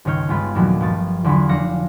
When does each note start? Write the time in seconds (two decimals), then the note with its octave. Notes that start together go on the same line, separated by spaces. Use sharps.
0.05 G1 C#2 D#3 C#5 F6 G6
0.29 G1 G#3 B3 F4 B5
0.55 D#2 A#2 F3 F#3 A3
0.81 G1 F3 A6
1.24 E2 D3 F3 F#3 B5
1.49 F1 D4 F5 A#6 C#7